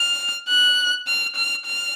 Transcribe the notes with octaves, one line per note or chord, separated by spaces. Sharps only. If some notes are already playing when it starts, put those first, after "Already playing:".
Already playing: F6
F#6
F6
F6
F6